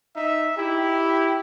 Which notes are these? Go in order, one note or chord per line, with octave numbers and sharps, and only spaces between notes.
D#4 E5
E4 G4